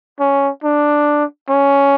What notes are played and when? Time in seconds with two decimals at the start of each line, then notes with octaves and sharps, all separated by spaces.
0.20 C#4
0.64 D4
1.49 C#4